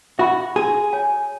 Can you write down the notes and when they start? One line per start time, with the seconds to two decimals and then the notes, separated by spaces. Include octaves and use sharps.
0.19 F#4 E5 B5
0.56 F#4 G#4
0.93 C#5 G#5